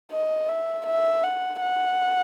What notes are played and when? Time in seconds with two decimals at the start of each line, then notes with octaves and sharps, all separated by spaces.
0.12 D#5
0.49 E5
0.86 E5
1.24 F#5
1.61 F#5